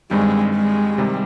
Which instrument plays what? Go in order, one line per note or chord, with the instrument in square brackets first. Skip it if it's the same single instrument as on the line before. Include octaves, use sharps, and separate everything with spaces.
[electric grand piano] G2 D#3 G3 C4 [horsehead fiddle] G#3
[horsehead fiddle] G#3
[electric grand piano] C3 D#3 G3